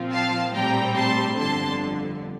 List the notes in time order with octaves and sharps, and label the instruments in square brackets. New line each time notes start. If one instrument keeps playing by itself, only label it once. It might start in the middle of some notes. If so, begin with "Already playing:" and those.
Already playing: [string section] A#2 F3 C4 F4
F5 A5
A#1 A2 G3 C4 G5 A#5
A5 C6
G1 F2 D3 A5 C6